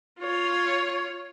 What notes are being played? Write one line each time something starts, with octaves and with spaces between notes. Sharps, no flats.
F4 C#5